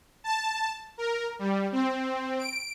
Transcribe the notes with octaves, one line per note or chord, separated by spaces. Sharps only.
A5
A#4
G3
C4
D7